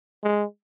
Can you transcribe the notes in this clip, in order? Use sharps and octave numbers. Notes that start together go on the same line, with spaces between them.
G#3